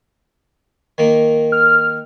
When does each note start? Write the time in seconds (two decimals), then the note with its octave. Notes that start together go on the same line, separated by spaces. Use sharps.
0.98 D#3 A#3
1.52 F6